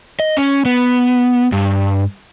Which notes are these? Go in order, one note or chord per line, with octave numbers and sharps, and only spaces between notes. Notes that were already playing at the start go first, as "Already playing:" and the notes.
D#5
C#4
B3
G2